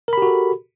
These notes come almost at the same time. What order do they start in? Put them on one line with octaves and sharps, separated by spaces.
A#4 B5 G4 F#4 A4